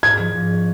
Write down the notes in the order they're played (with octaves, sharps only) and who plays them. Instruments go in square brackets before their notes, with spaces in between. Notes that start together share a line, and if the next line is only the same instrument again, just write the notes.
[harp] G#2 [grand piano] G#6
[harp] F3
G#2
C#4